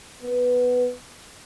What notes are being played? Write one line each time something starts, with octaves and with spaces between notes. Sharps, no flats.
B3